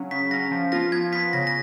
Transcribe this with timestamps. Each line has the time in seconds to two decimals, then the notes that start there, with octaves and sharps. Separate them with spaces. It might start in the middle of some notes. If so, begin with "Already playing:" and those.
Already playing: C#3 F#3 C#4
0.11 C#3 B6
0.31 F#3 C#4 A#6
0.51 F3
0.72 B3 F4 A#6
0.92 F3 G#6
1.12 B3 F4 B6
1.33 C#3 A#6
1.47 A#6